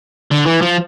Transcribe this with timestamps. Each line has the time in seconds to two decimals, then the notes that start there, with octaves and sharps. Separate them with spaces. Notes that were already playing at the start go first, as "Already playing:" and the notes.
0.31 D3
0.46 E3
0.61 F3